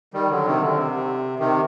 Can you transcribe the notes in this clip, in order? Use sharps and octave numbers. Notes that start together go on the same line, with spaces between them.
D#3 G3
D3 F#3
C3 D#3
D3
C3
C3 D#3